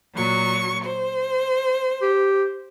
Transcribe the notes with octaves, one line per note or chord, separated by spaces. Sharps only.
A#2 F#3 C#6
C5
G4